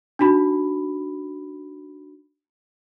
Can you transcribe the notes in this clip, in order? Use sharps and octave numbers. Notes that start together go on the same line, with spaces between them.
D4 D#4 F#4 B5